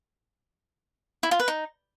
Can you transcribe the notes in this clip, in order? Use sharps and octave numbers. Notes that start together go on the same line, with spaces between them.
E4
F4
B4
D#4